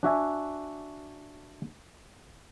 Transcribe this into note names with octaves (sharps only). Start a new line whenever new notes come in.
D4 F#4 E5 G#5